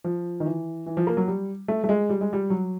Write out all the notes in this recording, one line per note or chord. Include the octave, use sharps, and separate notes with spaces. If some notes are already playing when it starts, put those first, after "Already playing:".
F3
D#3
E3
E3
F3
A#3
F#3
G3
A3
A3
G#3
G3
G#3
G3
F#3